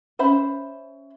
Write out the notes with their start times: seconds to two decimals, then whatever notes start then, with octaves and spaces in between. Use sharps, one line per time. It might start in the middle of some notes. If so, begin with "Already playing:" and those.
0.19 C#4 C5 E5 B5